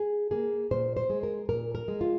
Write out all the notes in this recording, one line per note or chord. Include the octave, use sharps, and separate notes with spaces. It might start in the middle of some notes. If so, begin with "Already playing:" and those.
Already playing: G#4
A#3 G#4
A#2 C5
C5
G#3
A#4
A#2 A#4
A#4
G#3
F4